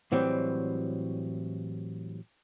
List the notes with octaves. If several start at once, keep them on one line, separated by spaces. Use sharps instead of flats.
A2 E3 F#3 G3 C4